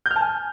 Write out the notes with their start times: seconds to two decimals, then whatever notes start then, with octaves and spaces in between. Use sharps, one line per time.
0.06 G6
0.11 F6
0.16 A5
0.21 G#5